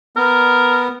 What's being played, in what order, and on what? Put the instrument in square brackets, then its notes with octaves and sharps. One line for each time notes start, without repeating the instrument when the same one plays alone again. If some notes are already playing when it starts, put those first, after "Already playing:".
[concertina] B3 [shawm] A#4